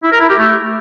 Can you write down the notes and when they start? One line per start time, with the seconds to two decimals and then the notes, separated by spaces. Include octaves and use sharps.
0.02 E4
0.11 A#4
0.20 E4
0.28 G4
0.37 A3